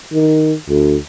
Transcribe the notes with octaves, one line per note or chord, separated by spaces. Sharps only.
D#3
D2